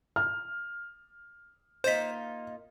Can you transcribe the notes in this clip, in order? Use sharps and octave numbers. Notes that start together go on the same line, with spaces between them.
F6
A#3 D#4 F4 C5 B6